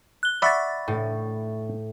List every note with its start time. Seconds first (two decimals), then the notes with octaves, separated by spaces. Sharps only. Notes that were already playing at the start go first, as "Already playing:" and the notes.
0.23 F#6 G7
0.42 D5 E5 F#5 B5 C#6 A6
0.88 A2